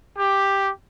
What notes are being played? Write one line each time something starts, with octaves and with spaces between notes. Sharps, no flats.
G4